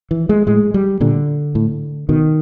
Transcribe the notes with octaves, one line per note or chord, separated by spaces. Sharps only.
E3
G#3
A2 G#3
G3
A#2 D3
A2
B2 D#3